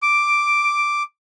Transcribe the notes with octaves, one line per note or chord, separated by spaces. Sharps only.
D6 D7